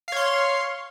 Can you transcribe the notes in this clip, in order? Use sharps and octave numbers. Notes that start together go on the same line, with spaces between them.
C#5 F5 C6